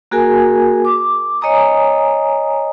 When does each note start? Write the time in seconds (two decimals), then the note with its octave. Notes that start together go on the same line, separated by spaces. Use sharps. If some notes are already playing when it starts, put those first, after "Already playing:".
0.11 A#3 F#4 G#4 A#4 G#5
0.85 D6
1.41 C#5 D#5 G#5 A#5 D#6